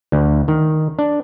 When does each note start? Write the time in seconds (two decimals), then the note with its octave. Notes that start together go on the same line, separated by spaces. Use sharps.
0.12 D2
0.48 D#3
0.99 D4